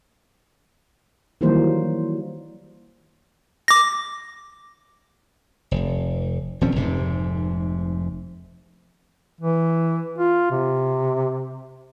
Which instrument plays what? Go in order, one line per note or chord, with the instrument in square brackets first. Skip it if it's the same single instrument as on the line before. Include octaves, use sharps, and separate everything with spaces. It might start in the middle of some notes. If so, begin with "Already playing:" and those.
[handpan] D#3 E3 F#3 G3 A#3 C5
[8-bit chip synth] D6 A#6
[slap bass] F1
D#1 F3 C4 C#4
F1 G#2 C3
[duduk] E3
F4
C3